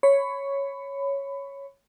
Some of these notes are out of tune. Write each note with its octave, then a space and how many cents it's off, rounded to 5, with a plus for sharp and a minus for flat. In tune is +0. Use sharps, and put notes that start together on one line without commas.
C#5 +0 B5 +20